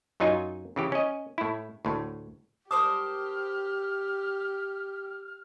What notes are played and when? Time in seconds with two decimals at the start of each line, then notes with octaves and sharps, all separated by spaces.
0.20 F#2 F#3 D#4 F4 D#5 G#5
0.76 C#3 E3 G4
0.92 C#4 D#5
1.38 A2 E4
1.85 D2 A2
2.71 G4 A#4 C5 A5 D6 D#6 F6